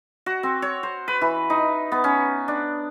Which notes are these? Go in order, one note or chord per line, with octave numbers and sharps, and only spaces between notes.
F#4
C4
C#5
C5
B4
E3
D#4
B3
C#4
D4